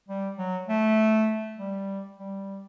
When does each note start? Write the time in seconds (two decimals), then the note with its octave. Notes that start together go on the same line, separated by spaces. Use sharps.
0.09 G3
0.38 F#3
0.69 A3
1.58 G3
2.19 G3